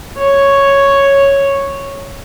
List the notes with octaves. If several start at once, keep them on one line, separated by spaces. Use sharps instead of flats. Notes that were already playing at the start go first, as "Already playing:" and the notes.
C#5